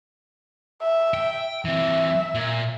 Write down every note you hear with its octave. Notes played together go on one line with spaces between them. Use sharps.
E5
G5
E3 C4 E5
A#2